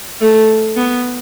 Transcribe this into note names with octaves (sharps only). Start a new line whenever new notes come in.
A3
B3